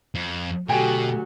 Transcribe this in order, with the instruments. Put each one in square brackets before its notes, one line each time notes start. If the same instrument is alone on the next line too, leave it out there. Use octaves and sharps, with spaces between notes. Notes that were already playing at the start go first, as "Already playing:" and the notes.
[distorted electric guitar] F2
[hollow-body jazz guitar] D2 G5 G#5 [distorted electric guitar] B2 [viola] F#3 [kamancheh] G4 A4